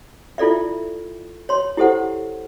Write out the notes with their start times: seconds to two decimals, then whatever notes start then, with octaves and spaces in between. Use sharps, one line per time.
0.38 E4 F4 A4 D5 E5
1.49 C#5 C6
1.77 E4 G4 A4 C5 F#5